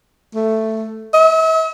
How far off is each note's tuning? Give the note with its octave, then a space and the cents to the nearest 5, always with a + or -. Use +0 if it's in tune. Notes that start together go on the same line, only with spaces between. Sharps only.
A3 +5
E5 -45